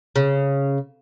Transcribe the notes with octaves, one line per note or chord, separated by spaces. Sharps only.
C#3